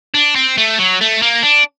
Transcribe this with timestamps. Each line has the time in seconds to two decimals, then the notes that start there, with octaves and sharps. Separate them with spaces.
0.15 D4
0.35 C4
0.58 A3
0.78 F#3
1.01 A3
1.22 A#3
1.43 D4